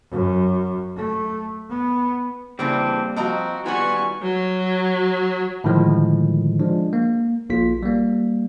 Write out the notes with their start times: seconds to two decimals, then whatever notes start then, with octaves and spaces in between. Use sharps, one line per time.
0.10 F#2
0.96 A3
1.70 B3
2.59 C#3 E3 G3 A#3 C4 D4
3.16 F3 C4 F#4 D#5 A#5
3.66 D#3 G3 B3 F4 F#4 B4 G#5 C#6
4.22 F#3
5.64 A2 D3 D#3 F3 G#3
6.60 F3 G#3 D4
6.93 A#3
7.50 A#1 A#3 F4 B6
7.83 G3 A#3